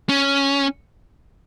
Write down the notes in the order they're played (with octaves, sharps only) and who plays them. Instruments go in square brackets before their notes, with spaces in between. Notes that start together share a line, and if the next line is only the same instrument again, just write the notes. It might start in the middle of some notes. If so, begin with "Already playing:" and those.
[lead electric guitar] C#4